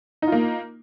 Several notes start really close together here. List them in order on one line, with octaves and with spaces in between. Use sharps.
D#4 F4 A#3